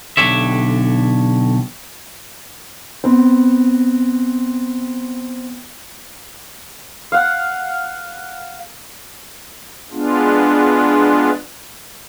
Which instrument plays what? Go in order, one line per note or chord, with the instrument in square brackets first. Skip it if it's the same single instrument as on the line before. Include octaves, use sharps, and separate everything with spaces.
[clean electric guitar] B1 D3 G4 C#5 E5
[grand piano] B3 C4
[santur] F5 F#5
[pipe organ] G#3 B3 D4 F4